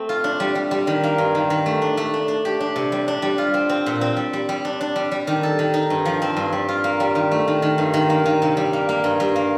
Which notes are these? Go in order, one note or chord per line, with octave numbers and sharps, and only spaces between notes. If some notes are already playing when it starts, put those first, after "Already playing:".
Already playing: A3 C4
F4
D4
G3
G3
G3
D#3
A#3
G2
D#3
D#3
A3
D4
A3
D4
D4
G4
D4
C3
G3
D4
G3
F4
C4
C4
A#2
C4
G3
G3
G3
D4
D4
G3
G3
D#3
A4
D#3
D#4
G2
F3
C4
G2
G3
F4
A#3
G3
D#3
A3
D#3
D#3
G2
D#3
A#3
D#3
C3
G3
A#3
A#3
G2
G2
A#3